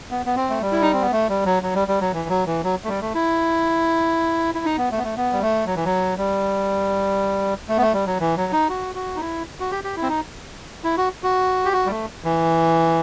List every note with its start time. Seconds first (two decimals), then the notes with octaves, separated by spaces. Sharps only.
0.11 B3
0.26 B3
0.36 C4
0.50 A3
0.61 G3
0.72 E4
0.82 D#4
0.93 C4
1.02 B3
1.12 A3
1.29 G3
1.45 F#3
1.63 F#3
1.75 G3
1.88 G3
2.00 F#3
2.13 E3
2.29 F#3
2.46 E3
2.64 F#3
2.84 A3
2.89 G3
3.01 A3
3.15 E4
4.55 E4
4.65 D#4
4.78 B3
4.91 A3
4.98 B3
5.03 A3
5.17 B3
5.33 G3
5.42 A3
5.66 F#3
5.76 E3
5.85 F#3
6.18 G3
7.69 A3
7.78 B3
7.82 A3
7.94 G3
8.07 F#3
8.20 E3
8.37 F#3
8.53 D#4
8.69 F#4
8.95 F#4
9.16 D#4
9.20 E4
9.60 F#4
9.71 G4
9.84 G4
9.97 E4
10.02 C4
10.09 D#4
10.84 E4
10.97 F#4
11.23 F#4
11.65 G4
11.73 F#4
11.86 G3
11.90 A3
12.24 E3